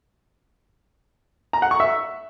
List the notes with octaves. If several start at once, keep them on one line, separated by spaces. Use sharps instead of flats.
A#5
F#5
C#6
E5